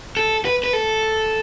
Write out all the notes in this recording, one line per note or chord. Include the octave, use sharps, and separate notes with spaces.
A4
B4
B4
A4